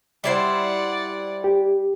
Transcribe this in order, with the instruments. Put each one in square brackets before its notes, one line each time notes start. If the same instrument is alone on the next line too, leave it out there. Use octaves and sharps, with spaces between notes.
[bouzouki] G3 E4 C5 [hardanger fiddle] D5 F#5
[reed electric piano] G4